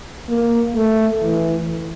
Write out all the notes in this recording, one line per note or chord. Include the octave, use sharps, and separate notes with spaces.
A#3
A3
E3